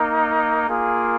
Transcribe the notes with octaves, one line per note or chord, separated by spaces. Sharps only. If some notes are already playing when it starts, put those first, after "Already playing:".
Already playing: A#3 D#4
A#3 F4 G#4